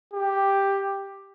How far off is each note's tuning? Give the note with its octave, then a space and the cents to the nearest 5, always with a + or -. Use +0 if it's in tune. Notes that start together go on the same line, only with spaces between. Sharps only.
G4 +5